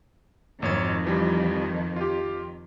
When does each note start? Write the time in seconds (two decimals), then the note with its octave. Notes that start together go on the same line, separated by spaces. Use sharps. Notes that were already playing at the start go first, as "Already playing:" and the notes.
0.62 G#1 F2 D#3 C#5 G#6
1.05 E3 F3 G3
1.96 F4 G4